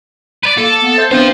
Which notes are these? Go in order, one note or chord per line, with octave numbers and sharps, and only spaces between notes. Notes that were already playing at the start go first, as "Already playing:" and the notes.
B4 D5
A#3 A4
B3
C5 E5 G#6 C7
B3 C4 D4 F4 C5